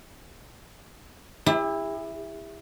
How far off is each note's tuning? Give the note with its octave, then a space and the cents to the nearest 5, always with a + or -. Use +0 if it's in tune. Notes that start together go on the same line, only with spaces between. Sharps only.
E4 +0 G4 +45